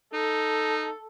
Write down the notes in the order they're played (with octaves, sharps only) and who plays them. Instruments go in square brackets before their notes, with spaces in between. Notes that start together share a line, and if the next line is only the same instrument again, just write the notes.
[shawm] D#4 [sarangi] A4